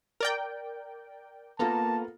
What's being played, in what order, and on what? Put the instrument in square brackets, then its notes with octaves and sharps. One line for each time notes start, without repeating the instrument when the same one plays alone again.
[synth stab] A#4 D5 G5
[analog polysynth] A#3 A4 A#5 [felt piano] B3 F4 [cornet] A5